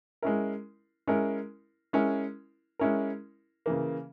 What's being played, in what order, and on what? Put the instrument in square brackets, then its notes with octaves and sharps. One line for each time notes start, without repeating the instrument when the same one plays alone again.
[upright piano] G#3 C#4 E4 A#4
G#3 C#4 E4 A#4
G#3 C#4 E4 A#4
G#3 C#4 E4 A#4
C#3 E3 A#3